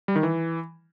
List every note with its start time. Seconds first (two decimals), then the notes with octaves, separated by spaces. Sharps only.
0.08 G3
0.16 D#3
0.23 E3